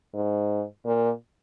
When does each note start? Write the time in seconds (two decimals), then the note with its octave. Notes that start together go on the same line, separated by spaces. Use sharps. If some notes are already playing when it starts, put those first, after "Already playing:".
0.14 G#2
0.85 A#2